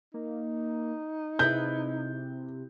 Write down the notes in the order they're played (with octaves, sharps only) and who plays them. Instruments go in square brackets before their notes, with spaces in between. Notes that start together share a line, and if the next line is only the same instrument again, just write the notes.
[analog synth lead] A#3 [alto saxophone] D#4
[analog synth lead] C3 [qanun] E4 G#4 B4 [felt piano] G6